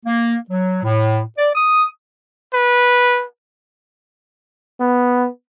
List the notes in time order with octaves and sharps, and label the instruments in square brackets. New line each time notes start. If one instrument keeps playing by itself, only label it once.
[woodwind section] A#3
F#3
A2
D5
D#6
[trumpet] B4
[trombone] B3